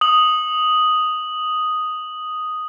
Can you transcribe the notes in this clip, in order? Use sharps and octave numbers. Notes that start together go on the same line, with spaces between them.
D#6 F#7